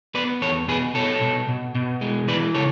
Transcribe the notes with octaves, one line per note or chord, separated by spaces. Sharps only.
B3 B4 D5
E2 A4 C#5
B2 G#4 B4
B2 A4 C#5
B2
B2
B2
G#3
E3 B4 D5
C#3 A4 C#5